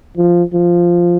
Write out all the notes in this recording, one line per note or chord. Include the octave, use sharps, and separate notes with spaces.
F3
F3